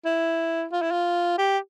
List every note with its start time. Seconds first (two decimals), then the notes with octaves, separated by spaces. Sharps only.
0.05 E4
0.72 F4
0.82 E4
0.92 F4
1.38 G4